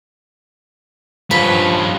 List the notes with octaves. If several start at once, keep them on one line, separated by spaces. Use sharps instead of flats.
G2 F3 C#4 B4